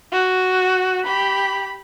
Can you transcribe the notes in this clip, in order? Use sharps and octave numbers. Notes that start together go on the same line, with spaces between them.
F#4
G4 B5